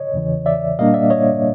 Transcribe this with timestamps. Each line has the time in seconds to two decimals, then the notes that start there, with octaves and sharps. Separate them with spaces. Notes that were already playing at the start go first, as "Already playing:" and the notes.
Already playing: C#5 D#5
0.13 E2 C#3 E3
0.46 D5 E5
0.79 A#2 G3 A#3 D4 D#5 F5
0.94 D5 E5
1.10 C#5 D#5